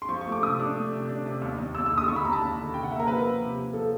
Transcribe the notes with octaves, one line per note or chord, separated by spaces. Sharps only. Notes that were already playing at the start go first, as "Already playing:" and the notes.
C6
F3 C#6
C#6
A3
D6
C3 D#6
D4
A3
C3
D4
C3
D#2
D#2
D#2 E6
E6
D3
D#6
D#2 C#6
B5
D#2 A#5
A5
D#2
D3
C3 G5
F#5
A#3 E5
A#4
F3 B4
F3
C3
C3
F3 A4